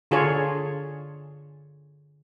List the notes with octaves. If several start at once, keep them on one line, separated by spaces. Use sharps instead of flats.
D3 F4 G#4 A4 C#5